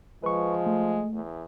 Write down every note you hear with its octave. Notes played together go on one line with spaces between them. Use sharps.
F3 G#3 B4 C#6
A3
E2